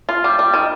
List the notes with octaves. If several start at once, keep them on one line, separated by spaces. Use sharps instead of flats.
F4
G3
G3
D#3